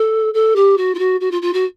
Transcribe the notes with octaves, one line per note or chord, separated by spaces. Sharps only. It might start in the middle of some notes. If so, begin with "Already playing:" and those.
Already playing: A4
A4
G4
F#4
F4
F#4
F#4
F4
F4
F#4